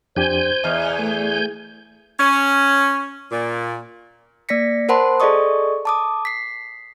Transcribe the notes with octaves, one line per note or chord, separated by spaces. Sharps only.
F2 D4 G4 C5 G#5 G6
E2 D#5 F6
A3 G#4
C#4
A#2
A#3 D5 A#6 B6 C#7
A#4 C5 F#5 A5 B5 C6
G#4 A4 D5 D#5 C#6 D#6
A5 D6 D#6
B6 C7